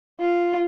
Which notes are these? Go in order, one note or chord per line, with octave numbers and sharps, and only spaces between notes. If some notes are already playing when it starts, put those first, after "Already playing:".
F4